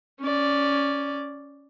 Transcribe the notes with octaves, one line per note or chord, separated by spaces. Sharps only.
C#4 D5